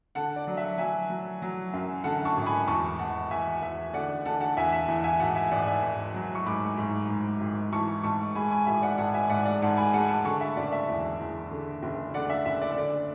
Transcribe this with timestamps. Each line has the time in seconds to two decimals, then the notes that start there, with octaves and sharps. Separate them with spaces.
0.15 D3 F#5 A5
0.36 D5
0.47 F#3
0.57 E5
0.78 F#3 E5 G#5
1.10 F#3
1.42 F#3
1.73 F#2
2.04 D3 F#5 A5
2.25 A5 C#6
2.37 G#1
2.46 G#5 B5
2.68 E2 A5 C#6
2.99 E2 F#5 A5
3.31 E2 E5 G#5
3.62 E2 E5
3.93 D3 D5 F#5
4.25 D3 F#5 A5
4.41 F#5 A5
4.57 E2 E5 G#5
4.72 E5
4.88 E2
5.04 E5 G#5
5.20 G#1 F#5 A5
5.36 E5 G#5
5.51 G#1 D5 F#5
5.67 E5 G#5
5.82 G#1
6.14 F#3
6.35 C#6
6.46 G#2 B5 D6
6.78 G#2
7.09 G#2
7.40 G#1
7.72 E3 A5 C#6
8.03 G#2 A5 C#6
8.35 G#3 G#5 B5
8.51 G#5 B5
8.66 G#1 E5 G#5
8.82 D5 F#5
8.98 G#1 F#5 A5
9.14 E5 G#5
9.30 G#2 D5 F#5
9.45 D5 F#5
9.62 G#2 F#5 A5
9.77 G#5 B5
9.93 G#3 F#5 A5
10.08 F#5 A5
10.24 D3 A5 C#6
10.41 E5
10.56 F#1 D5
10.72 E5
10.88 E2
11.20 E2
11.51 D3
11.83 F#1
12.14 D3 D5 F#5
12.30 E5
12.45 F#1 E5
12.61 D5
12.77 D3 D5